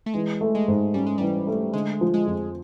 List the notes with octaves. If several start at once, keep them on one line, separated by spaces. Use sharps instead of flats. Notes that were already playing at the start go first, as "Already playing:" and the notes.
A3
E3 G#3
A3
G#3
G#2
G3 C#4
G#3
E3 G3
A3
D3 G#3
F3
G#3
F2